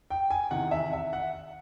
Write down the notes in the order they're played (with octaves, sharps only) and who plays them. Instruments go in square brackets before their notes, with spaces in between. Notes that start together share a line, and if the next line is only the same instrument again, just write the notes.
[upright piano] G5
G#5
E2 C3 D#3 F#5
E5
E5
F#5